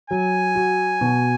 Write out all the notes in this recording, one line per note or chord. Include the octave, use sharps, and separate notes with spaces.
F#3 G#5
F#4
B2